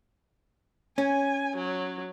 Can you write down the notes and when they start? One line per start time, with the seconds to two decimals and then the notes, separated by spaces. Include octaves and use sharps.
0.98 C#4 G#5
1.56 F#3